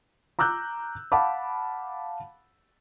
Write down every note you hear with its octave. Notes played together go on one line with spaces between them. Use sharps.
A#5 D6 E6 F#6 G6
F5 F#5 A5 B5 D6